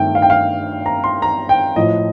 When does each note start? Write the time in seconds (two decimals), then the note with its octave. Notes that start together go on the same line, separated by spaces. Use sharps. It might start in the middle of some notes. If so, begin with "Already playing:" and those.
Already playing: G2 D#3 A3 C4 G5
0.15 F5
0.22 G5
0.30 F5
0.86 A#5
1.04 C6
1.22 A#5
1.49 G5
1.76 A2 F3 A3 D#5